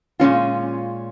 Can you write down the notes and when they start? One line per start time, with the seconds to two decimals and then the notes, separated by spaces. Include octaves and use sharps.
0.20 A#2 G#3 C#4 F4